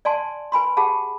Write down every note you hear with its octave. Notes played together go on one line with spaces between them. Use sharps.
D5 G#5 A5 C6
B4 G#5 B5 C6
G4 G#4 F#5 A5 B5